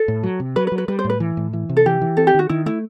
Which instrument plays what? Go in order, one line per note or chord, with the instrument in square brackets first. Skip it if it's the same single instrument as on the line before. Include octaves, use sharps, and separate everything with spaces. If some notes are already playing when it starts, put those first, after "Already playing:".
Already playing: [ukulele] A4
[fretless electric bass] A2
F#3
C3
[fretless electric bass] F#3 [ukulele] B4
[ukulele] B4
[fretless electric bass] F#3
[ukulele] B4
[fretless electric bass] G3 [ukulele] B4
[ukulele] C5
[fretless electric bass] A2
[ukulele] B4
[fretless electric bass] E3
A2
E3
C3
[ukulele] A4
[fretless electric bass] E3 [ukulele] G4
[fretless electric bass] E3
[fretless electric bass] C4 [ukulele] A4
[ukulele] G4
[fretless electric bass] D#3 [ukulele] F#4
[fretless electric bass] D#3 [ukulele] E4
[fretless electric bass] A3 [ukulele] E4